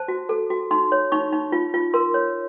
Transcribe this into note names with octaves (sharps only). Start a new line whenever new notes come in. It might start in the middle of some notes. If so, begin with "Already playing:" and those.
Already playing: C5 A5
F#4
A4
F#4
D#4 C6
C#5
D#4 C#6
D#4
F4
F4
A#4 C6
C#5